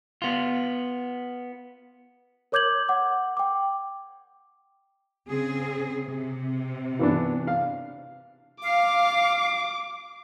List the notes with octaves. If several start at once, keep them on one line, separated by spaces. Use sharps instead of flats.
B3 F4
A#4 C#5 D6 G6 G#6 F#7
F#5 D6
G5 D6
C#3 C4 G#4
C3
E3 B3 D4
F5
F5 D6